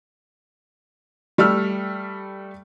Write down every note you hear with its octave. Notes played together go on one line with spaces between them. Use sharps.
G3 A3 E6 F6